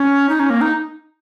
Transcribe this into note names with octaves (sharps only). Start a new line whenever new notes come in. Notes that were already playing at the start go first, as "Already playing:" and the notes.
Already playing: C#4
D#4
C#4
A#3
D#4